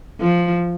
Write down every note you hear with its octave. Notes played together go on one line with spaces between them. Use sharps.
F3